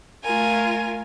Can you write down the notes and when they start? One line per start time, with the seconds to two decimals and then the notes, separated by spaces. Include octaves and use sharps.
0.23 A3 F4 A#4 G#5